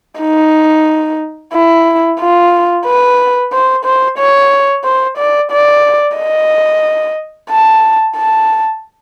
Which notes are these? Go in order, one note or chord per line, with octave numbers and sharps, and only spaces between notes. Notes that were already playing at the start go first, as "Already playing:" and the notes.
D#4
E4
F4
B4
C5
C5
C#5
C5
D5
D5
D#5
A5
A5